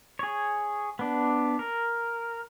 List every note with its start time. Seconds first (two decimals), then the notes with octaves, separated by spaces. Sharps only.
0.19 G#4 C#5
0.99 B3 D4
1.59 A#4